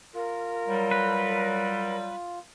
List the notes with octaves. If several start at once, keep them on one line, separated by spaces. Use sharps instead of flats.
F4 A#4
F#3 G3
B4